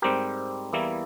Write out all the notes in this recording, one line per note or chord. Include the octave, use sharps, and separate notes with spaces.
G#2 G3 C4 G4 A#4
E2 E3 G3 A#3 E4